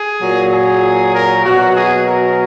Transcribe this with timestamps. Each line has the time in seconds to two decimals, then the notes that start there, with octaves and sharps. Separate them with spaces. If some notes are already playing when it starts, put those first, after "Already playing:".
Already playing: G#4
0.21 A#2 F#3
0.51 G#4
1.14 A#4
1.45 B2 F#3 F#4
1.76 G#4
2.07 A#4